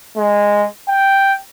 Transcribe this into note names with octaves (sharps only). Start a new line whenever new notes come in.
G#3
G5